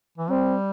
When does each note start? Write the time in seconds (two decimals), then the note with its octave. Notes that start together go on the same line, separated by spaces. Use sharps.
0.18 E3
0.30 G3 C4